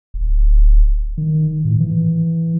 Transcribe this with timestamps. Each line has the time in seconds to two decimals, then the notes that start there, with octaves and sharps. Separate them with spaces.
0.14 D1
1.18 D#3
1.65 A2
1.80 E3